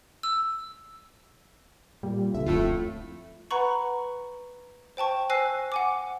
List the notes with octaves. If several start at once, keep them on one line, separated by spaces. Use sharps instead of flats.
E6
A#2 G3
C#2 D3 E5
D1 F2 A2 A3 F4
B4 F#5 A#5 B5 C#6
C5 G5 A5 C#6
C5 G#5 E6 F#6 A#6 C7
F#5 G#5 D6